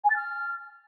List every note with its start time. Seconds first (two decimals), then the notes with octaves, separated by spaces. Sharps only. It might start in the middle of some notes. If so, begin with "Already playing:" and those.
0.04 G#5
0.10 A6
0.16 F6